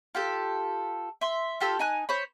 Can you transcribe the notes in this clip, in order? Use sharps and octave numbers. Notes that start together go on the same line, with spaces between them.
F4 G4 A4
E5 C6
F4 G4 A4 E6
D#4 G#5 F#6
C5 C#5 B5